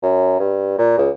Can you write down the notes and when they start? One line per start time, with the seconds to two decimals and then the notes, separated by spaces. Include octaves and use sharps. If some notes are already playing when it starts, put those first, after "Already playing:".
0.02 F#2
0.39 G2
0.78 A#2
0.98 C#2